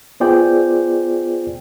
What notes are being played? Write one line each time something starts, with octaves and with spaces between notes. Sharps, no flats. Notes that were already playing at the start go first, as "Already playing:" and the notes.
B3 F4 G#4 C5 D5 G5